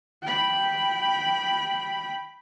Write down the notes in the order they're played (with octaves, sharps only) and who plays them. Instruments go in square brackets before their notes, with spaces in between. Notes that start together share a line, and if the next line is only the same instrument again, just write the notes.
[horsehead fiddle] G5 B5